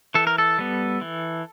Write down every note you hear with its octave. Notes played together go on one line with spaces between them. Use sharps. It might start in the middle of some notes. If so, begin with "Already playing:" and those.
E3 A4
A#4
A4
G3 B3
E3